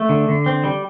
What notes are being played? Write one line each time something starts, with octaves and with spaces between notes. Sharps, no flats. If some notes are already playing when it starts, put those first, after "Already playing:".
Already playing: A3
D3
D3
C4
G3